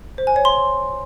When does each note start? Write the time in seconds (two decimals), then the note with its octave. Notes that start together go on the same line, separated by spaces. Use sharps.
0.18 C5
0.27 G#5
0.36 C#5
0.45 C6